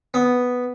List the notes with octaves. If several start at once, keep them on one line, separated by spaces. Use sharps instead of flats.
B3